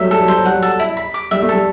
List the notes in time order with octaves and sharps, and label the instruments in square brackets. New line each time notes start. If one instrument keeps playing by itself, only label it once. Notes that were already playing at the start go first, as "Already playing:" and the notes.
Already playing: [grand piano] F#3 G3 A3 [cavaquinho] E5
[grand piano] G3 [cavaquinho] A4
[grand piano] F#3
[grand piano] G3 [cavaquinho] C5
[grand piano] F#3
[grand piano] G3 [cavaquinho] F#5
[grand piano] F#3
[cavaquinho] A4
E4
B5
D6
[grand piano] G3 [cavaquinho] E5
[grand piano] A3
[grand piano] G3 [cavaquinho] A4